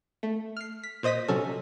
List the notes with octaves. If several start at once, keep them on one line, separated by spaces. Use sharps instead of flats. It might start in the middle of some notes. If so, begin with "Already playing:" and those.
A3
F6 C7
B6
A#2 C5 D#5 D#6 B6
C3 F#3 C#4 A4